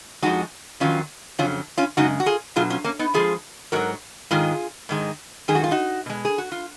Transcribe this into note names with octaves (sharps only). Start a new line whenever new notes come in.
F2 F3 G#3 D#4 F#4
F2 D#3 F#3 C#4 F4
F2 C#3 F#3 C#4 F4
C#4 F4
F#2 C#3 G#3 D#4 F#4
F#4
F4 G#4
B2 F#3 F4 G#4
C#4 F4
A#3 C#4
B3 D#4
F2 F3 G#3 F4 G#4
G#2 F#3 F#4 A#4
G#2 D#3 G#3 F4 G#4
G#2 D#3 G#3
F#2 D#3 G#3 G#4
F#4
F4
D#4 F#4
B2 G#3
G#4
F#4
F4